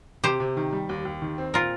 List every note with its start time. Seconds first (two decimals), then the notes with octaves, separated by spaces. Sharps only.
0.24 C3 G4 C5
0.40 C3
0.57 D#3
0.72 G3
0.89 D#2
1.05 D#2
1.22 D#3
1.38 C4
1.54 A#2 F4 A#4